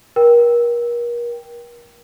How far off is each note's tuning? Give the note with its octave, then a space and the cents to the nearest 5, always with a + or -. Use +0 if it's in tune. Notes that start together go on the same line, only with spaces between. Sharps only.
A#4 +35 G5 +0